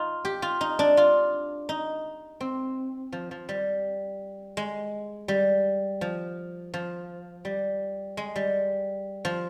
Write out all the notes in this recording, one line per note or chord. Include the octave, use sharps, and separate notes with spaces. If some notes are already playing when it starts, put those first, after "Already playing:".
Already playing: D#4 F4
G4
F4
D#4
D4
F4
D#4
C4
F3
F3
G3
G#3
G3
F3
F3
G3
G#3
G3
F3